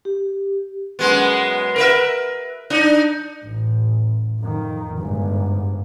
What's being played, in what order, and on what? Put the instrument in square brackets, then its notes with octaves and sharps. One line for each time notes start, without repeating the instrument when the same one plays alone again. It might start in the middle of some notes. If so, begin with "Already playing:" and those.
[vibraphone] G4
[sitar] F#2 G#3 B3
A#4 B4 E5
D4 D#4
[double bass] A1
F2 D#3
G1 G#2